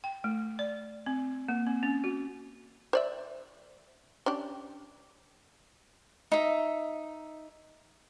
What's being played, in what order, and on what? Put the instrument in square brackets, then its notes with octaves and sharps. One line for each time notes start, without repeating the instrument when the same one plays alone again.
[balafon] G5
A3
D5
C4
A#3
C4
C#4
F#4
[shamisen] C5 D5 E5
C#4 D4 G4
[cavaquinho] D#4 E5